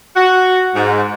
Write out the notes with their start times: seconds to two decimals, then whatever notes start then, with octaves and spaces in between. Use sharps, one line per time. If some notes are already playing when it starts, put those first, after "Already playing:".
0.15 F#4
0.74 G#2